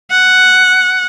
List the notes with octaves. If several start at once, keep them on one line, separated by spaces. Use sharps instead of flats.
F#5